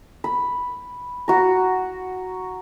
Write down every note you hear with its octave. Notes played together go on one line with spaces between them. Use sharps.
B5
F#4 A#5